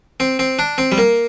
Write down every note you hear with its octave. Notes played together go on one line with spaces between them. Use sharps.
C4
C4
D4
C4
G3
A#3